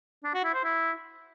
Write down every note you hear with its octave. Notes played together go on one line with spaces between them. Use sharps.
D4
F#4
E4
C5
E4